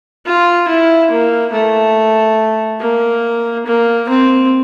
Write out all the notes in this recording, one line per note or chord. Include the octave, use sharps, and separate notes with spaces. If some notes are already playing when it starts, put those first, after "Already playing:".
F4
E4
A#3
A3
A#3
A#3
C4